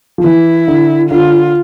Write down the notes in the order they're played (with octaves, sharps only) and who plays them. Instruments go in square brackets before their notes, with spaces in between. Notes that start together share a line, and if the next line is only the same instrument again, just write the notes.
[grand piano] F3
[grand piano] E3 [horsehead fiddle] E4
[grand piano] D3
[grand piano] D3 [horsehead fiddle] F4